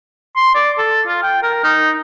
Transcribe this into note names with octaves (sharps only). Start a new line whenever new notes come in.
C6
D5
A4
F4
G5
A#4
D#4